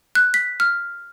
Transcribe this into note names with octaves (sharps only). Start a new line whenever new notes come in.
F#6
B6
F6